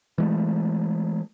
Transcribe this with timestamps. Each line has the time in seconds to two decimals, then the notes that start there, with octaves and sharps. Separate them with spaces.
0.18 E3 G#3 A3